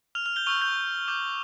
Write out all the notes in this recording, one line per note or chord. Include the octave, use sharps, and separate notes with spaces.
F6 F7
F6 F7
G6 G7
C#6 E6 F6 G6 F7
G6 G7
D6 G6